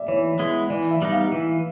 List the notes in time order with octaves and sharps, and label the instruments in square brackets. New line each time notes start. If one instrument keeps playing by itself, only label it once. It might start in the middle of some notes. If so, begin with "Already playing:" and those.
Already playing: [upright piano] D5 E5
[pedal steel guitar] E3 [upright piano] C#5
[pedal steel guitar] G#3 B3 E4
[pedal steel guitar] E3 [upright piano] D5
[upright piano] E5
[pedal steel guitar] G3 B3 D#4
[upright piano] F5
[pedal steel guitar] E3